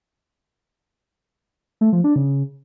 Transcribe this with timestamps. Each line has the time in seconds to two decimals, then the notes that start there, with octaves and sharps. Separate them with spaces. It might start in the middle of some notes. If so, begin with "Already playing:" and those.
1.81 A3
1.93 F3
2.04 D4
2.16 C#3